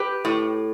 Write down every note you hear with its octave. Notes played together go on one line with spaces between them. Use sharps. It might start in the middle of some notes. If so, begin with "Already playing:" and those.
Already playing: G4 B4
A2